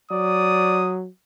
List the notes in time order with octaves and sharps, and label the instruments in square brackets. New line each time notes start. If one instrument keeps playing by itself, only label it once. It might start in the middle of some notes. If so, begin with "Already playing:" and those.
[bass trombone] F#3 [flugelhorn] D5 [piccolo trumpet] D#6